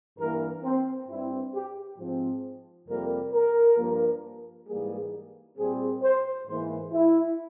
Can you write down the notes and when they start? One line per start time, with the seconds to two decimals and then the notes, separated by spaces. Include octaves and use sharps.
0.19 G2 E3 A#3 A#4
0.64 C4
1.09 G2 G3 C4 E4
1.54 G4
1.98 G#2 F3 C4
2.88 F2 C3 G3 A#3 A#4
3.33 A#4
3.78 G2 F3 A#3
4.68 G#2 E3 G3 A#3 G#4
5.58 A#2 G3 C4 G#4
6.03 C5
6.47 G#2 E3 A#3 C5
6.93 E4